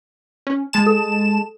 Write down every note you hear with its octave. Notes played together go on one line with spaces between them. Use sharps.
C#4
G#3 A5 E7
A4